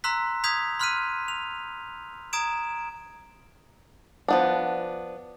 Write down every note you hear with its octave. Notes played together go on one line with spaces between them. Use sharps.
A#5 C6 E6 F#6 B6
D#6 G6 G#6 B6 F7
B5 C6 F6 F#6 B6 D#7
F7
A#5 D#6 G#6 D7 E7
F3 B3 D4